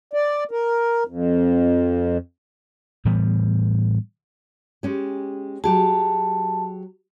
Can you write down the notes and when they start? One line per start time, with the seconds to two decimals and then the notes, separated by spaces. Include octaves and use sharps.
0.13 D5
0.51 A#4
1.07 F2
3.05 A2 E3 G3 B3
4.83 G#3 C#4 G4
5.64 F#3 G4 G#4 A5